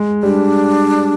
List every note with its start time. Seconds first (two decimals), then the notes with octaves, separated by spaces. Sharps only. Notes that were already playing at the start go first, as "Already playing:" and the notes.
Already playing: G#3
0.23 G3 D4